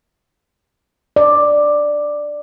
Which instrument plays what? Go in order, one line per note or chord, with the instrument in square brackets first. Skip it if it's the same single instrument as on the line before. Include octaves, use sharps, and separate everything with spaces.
[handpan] D5